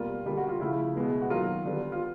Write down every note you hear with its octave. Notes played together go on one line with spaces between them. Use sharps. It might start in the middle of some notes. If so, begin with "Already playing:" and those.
Already playing: B2 G3 A#3 F4
D3 G3 A#3
F#4
F4
C#3 F3 A3 E4
B2 G#3 B3
F#4
D#3 F#3 A#3 F4
D3 G3 B3
F4